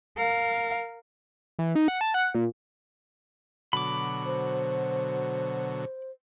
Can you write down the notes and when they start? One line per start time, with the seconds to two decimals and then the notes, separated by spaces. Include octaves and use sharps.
0.17 A#4 F5
1.59 E3
1.75 D#4
1.88 F#5
2.01 A5
2.14 F#5
2.34 A#2
3.73 B2 D3 F#3 B5 D6
4.24 C5